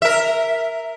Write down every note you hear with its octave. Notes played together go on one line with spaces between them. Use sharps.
A#4 E5